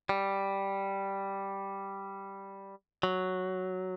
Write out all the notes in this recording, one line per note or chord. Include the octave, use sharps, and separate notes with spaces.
G3
F#3